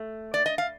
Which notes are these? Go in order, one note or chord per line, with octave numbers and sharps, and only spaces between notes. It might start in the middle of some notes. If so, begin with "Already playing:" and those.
Already playing: A3
D5
D#5
F5